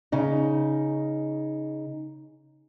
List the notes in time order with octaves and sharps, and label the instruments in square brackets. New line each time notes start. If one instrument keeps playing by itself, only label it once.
[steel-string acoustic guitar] C#3 D#4